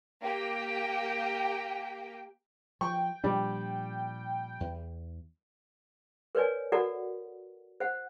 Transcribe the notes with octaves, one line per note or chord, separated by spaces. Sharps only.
A#3 G4 G5
F3 G5 C#6
A#2 F3 G3 D4
E2
A#4 B4 C#5 D5 G#5
F#4 A4 A#4 D5 F#5 A#5
C5 F#5